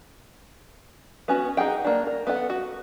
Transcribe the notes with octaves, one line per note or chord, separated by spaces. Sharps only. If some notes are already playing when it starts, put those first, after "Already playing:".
B3 C#4 F#4
D#4 G#4 F#5 G5
A#3 D4
A#4
B3 A4 F#5
F#4